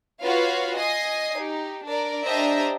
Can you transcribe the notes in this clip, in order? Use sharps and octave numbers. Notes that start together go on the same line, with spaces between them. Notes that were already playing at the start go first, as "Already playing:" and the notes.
F4 F#4 B4 C#5 F5
D#5 G#5 D#6 C7
D#4 G4
D4 A#4 D5
D4 G4 C5 D#5 E5 A#5